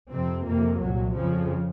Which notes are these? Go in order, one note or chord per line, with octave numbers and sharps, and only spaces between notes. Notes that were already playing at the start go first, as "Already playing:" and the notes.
F2 C3 C4
F2 C3 A#3
C2 A#2 F#3
F2 C#3 F3